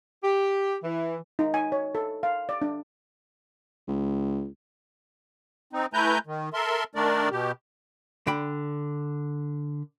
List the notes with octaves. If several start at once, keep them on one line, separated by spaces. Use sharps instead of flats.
G4
E3
D#4
G#5
C#5
A4
F5
D5
D4
C#2
C4 D#4
A3 E4 B4 G#5 A#5 G6
D#3
A4 A#4 E5 C6
D#3 A3 D4 A#4 D5
B2 G4
D3 G5 B5